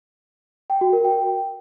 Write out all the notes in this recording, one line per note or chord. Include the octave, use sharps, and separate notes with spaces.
G5
F#4
A#4
G5